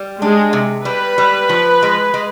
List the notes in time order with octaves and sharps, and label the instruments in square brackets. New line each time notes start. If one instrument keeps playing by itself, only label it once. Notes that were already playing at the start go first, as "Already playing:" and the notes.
Already playing: [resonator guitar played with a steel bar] G3
[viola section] G#3 [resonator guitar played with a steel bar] D4
[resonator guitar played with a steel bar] C3
[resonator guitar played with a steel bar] G3 [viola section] B4
[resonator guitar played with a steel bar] G3
F3
G#3
G#3